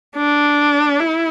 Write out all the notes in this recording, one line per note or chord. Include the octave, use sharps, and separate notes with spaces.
D4
E4